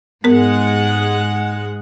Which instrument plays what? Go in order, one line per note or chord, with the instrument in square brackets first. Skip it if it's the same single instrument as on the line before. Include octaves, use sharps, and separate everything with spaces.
[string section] G#2 G#3 F#5 [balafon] B3 A#4